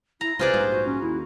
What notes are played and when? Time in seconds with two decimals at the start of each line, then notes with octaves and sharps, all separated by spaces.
0.21 E4 A#5
0.39 C#2 C3 F4 G#4 B4 C5 D5
0.53 A#1 G#2 G3 D#4
0.72 F#4
0.86 C#4
1.02 D#2 E4